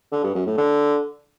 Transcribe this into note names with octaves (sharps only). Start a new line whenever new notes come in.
D3
G2
F#2
A2
D3